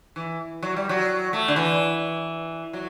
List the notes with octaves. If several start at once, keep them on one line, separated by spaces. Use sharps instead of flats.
E3
F#3
G3
F#3
A3
D3
E3
F#3